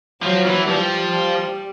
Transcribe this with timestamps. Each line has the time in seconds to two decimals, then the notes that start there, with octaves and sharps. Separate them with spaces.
0.23 F3 F#3
0.46 E3
0.69 F3 G3